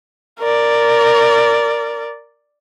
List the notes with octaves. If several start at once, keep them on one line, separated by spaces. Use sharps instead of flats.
A#4 D5